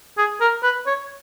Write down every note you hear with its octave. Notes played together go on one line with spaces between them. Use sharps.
G#4
A#4
B4
C#5